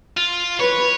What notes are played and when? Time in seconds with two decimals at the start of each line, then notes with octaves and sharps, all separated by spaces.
0.17 F4
0.60 B4 C#5